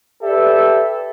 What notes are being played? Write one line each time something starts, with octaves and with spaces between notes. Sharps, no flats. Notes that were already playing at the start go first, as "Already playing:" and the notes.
G4 A4 B4 D5 E5